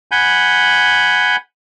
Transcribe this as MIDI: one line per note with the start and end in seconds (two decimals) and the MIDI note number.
0.11 1.36 78
0.11 1.36 80
0.11 1.36 83
0.11 1.36 91